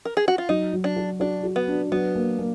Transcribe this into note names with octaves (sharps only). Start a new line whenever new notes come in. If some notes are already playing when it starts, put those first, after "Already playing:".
A#4
G#4
F#4
F4
F#3 D#4
F#3
D4
F#4
D4 F#4
F#4
B3
D4
F#3 B3
A#3
A#3